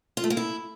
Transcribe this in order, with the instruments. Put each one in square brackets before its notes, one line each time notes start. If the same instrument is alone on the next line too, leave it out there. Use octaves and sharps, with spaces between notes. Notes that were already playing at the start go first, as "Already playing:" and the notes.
[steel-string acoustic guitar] F4
A3
A#3
E4